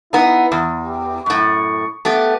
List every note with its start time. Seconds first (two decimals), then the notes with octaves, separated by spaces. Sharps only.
0.13 B3 D#4 E4
0.52 E2
0.83 G4
1.26 F#2 A2 C#6
2.05 A3 B3 G4